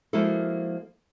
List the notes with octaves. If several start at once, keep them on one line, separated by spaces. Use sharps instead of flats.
F3 G#3 A#3 E4 F#4 A4